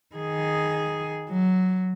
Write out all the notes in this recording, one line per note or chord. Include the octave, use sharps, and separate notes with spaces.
D#3 G#4
F#3